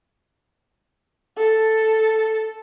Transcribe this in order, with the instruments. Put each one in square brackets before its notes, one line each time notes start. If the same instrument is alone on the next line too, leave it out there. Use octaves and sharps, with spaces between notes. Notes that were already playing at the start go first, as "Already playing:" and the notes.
[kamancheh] A4